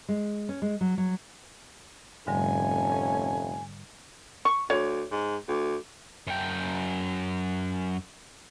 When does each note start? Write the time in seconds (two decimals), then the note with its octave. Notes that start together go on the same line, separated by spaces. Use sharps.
0.09 G#3
0.49 C#4
0.62 G#3
0.81 F#3
0.98 F#3
2.27 F1 G#2 D3 G3 A3 C#4 G#5
4.45 C#6
4.70 D2 C#5
5.11 G#2
5.48 D2
6.27 F#2 G5